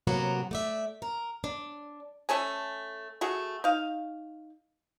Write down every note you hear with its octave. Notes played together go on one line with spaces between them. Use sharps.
A2 C3 F#3 A#3 B3 F#4
A3 D5 E5
A#4
D4
A3 C#4 A4 G#5
A3 F#4 G#4
D#4 F5